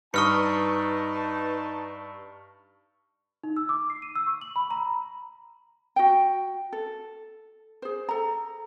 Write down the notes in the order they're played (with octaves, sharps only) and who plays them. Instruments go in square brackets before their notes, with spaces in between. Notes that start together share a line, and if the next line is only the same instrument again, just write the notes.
[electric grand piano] G2 D#6 [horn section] D#4 A5 [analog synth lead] B4 [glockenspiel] C#6 F6 C#7
[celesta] D#4
E6
D6
C7
D#7
E6
C#6
F#7
B5
A#5
[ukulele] F#4 G5
A4
G#4 C5
A4 A#5